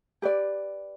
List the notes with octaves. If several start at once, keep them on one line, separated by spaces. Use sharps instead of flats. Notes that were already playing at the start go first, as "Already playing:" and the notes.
G4 B4 D5